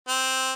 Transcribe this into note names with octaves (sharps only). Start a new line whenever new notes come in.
C4